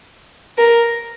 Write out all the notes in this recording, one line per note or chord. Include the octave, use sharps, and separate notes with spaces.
A#4